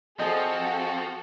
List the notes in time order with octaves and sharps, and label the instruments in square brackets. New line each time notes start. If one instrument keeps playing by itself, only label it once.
[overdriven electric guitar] F3 [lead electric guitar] C4 [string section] F#4 A4 [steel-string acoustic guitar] G#4 D#5